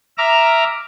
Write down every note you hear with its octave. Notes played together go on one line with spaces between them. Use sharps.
E5 A#5 D6 F6